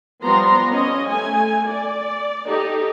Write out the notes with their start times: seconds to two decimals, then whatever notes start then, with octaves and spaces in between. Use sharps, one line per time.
0.24 F3 G3 B3 A#5 C6
0.72 C#4 D#5
1.11 A3 G#5
1.68 D5
2.47 D#4 G4 A4